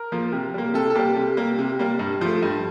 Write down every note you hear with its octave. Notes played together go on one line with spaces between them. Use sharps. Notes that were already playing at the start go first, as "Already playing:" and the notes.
Already playing: A#4
F3 A#3
C3
G3 A#3
C3 A4
A4
G3 A#3 G4
C3
G3 A#3
C3
G3 A#3
G2
F3 A3
G2